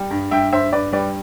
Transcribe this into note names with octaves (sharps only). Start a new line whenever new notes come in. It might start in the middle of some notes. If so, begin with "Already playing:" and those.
Already playing: G3
G2
G2 E5 G5
G2 C5 E5
G2 B4 D5
G3 B4 D5